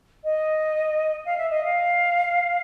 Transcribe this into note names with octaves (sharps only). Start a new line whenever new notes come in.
D#5
F5
E5
D#5
F5